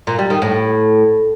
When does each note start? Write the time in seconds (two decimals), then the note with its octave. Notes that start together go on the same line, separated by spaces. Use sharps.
0.07 A#2
0.19 G3
0.30 D#3
0.42 A2